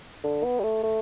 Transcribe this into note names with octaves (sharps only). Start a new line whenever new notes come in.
D3
B3
G3
A3
A3